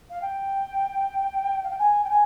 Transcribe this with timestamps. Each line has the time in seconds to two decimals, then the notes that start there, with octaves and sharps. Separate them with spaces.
0.09 F5
0.22 G5
1.63 F5
1.70 G5
1.78 G#5
2.04 G5
2.09 G#5